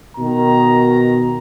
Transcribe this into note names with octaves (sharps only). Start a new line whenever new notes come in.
B2 D#3 A#5